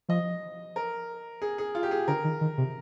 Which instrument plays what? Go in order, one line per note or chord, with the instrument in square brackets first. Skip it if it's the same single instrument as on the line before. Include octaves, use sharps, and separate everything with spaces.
[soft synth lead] F3 [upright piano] D#5
[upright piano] A#4
G#4
G#4
F4
G4
G#4
[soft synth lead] D3 [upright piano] A#4
[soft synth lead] D#3
D#3
C3